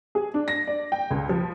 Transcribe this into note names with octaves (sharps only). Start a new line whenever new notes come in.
G#4
D4
A#6
D5
G5
C#2
F3